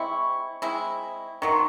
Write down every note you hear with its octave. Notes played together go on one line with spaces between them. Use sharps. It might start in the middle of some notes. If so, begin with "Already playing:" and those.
Already playing: G#3 C4 E4 C#6
G#3 C4 E4
D#3 F#3 A3 C#6
C6